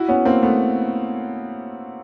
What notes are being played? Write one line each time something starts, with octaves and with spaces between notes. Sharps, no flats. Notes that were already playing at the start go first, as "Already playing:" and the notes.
Already playing: E4 F#4
B3 C#4
A#3 C4
A3 B3